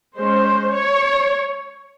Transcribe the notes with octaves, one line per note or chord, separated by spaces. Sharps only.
G#3 C#4 C5
C#5